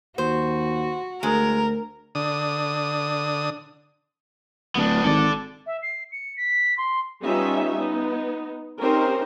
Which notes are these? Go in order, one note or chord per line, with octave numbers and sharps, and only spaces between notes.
D#2 F#4 C5
D2 G#3 A#4
D3 D#6
D1 B3 D4
G#1 A4 D5
E5
C7
C#7
B6
C6
G3 B3 C#4 D#4 F4 E5
B3 D#4
C4 C#4 D#4 G4 A#4 C5